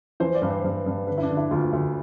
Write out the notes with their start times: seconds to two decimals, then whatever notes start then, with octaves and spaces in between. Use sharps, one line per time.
0.20 E3 C5
0.35 D5
0.42 G2
0.50 C5
0.64 G2
0.86 G2
1.07 D3 B4
1.18 E4
1.22 D4
1.29 D3
1.37 E4
1.51 D2 F4
1.73 D2